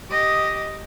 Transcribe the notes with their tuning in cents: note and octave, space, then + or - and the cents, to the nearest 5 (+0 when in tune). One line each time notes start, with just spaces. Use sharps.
G4 -5 D#5 +0